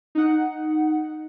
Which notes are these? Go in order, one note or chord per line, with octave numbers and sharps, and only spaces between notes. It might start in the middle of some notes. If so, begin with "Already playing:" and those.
D#4 F#5